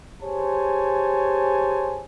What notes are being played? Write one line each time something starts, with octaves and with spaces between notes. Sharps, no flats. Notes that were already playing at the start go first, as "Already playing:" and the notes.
G4 G#4 C5 C#5 G#5 A5